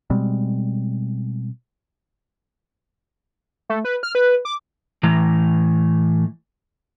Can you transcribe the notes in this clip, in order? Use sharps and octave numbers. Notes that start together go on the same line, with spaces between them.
B2 G3 G#3 C4
A3
B4
F6
B4
D6
A2 E3 A#5